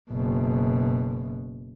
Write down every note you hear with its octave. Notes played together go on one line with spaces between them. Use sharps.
F#1 B2